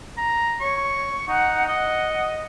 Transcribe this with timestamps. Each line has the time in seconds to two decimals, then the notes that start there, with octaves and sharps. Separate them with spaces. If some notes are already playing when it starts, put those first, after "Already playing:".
0.18 A#5
0.61 C#5 C#6
1.28 D#4 F#5
1.68 D#5 F#5